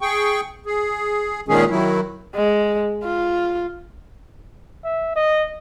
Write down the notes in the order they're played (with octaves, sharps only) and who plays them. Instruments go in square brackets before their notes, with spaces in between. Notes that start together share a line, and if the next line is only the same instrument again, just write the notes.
[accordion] G#4 G5 C#6
G#4
A#2 D#3 G#3 C#4 G#4
D#3 F#3 E4
[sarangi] G#3
F4
[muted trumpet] E5
D#5